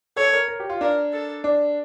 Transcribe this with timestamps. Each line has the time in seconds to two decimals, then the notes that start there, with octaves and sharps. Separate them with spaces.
0.16 A4 C#5
0.33 A#4
0.48 A#4
0.60 G4
0.69 F4
0.81 D4 A#4
1.12 A4
1.44 D4